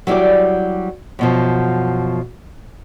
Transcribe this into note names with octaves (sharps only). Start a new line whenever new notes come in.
F#3 G3 E4 G4 D5
F#2 B2 F3